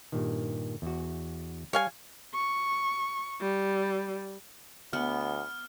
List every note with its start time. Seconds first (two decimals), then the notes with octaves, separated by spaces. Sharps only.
0.12 G2 A#2 D#3
0.82 E2 F#4
1.73 G3 C#5 F5 G#5
2.35 C#6
3.41 G3
4.93 D2 B3 F6